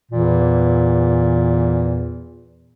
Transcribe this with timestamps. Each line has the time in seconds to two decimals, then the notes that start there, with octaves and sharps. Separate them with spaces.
0.12 E2 A#2 E3